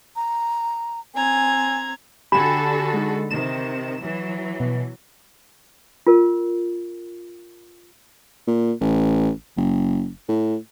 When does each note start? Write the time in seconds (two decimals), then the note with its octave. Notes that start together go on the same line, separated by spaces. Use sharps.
0.16 A#5
1.15 C4 G#5 A#5 G#6
2.32 D3 F#4 G4 A4 G#5 B5 E7
2.94 G#3 D#4
3.31 C3 D#3 E7
4.01 E3 F#3
4.60 B2
6.07 F4 A#4
8.47 A#2
8.81 A1
9.57 F#1
10.28 A2